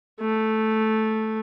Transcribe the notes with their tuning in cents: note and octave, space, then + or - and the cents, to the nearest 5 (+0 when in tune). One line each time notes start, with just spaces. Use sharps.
A3 -5